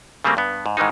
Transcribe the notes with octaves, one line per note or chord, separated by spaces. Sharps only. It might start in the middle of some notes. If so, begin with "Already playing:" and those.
C#3 G3 A3 A#3 C4
G2 B3
G#2
G#2 D#3 E3 G#3 D#4